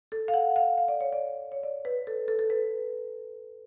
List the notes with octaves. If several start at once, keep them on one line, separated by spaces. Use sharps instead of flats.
A4
F5
F#5
F5
F5
D5
C#5
D5
C#5
D5
B4
A4
A4
A4
B4